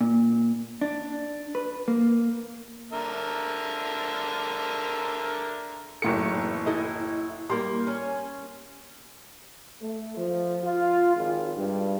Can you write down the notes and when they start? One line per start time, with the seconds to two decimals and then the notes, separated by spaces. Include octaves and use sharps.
0.01 A#2
0.81 D4
1.55 B4
1.88 A#3
2.92 D3 A#4 E5
6.02 F#1 A2 D#3 A4 C#7
6.34 E2
6.66 E4 A4 D#5
7.50 G3 A#3 C6
7.87 C#4
9.82 A3
10.17 F3
10.63 F4
11.16 G#1
11.56 G2